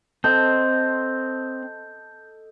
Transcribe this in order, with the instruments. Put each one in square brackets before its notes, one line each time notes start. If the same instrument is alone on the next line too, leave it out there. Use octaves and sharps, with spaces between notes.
[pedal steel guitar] C4 [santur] A4 D#5 A5 [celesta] G6